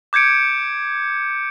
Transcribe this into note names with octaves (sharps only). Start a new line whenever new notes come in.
D6 G6 G#6 C#7 D7